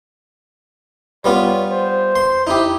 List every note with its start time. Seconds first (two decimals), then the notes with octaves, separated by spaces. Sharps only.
1.24 G3 B3 F4 C#5
1.70 C5
2.16 C6
2.47 D#4 E4 G4